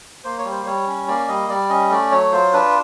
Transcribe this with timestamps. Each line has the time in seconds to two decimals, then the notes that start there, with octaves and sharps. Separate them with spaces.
0.24 A#3 C5
0.39 C#5
0.45 G3
0.51 C5
0.66 G3 C#5
0.87 C#4
1.08 A#3 D5
1.28 G3 D#5
1.49 G3 D5
1.70 C#4 D#5
1.90 A3 D5
2.11 F#3 C#5
2.32 F4 C5
2.53 D4 B4